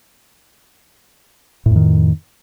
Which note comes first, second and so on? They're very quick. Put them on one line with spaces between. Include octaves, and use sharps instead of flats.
A2 F2 D#3